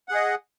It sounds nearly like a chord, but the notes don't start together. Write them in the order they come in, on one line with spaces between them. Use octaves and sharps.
F#5 G#4 D#5